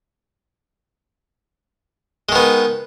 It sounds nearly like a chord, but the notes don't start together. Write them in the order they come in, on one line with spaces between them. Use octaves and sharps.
G#3 D#3 B3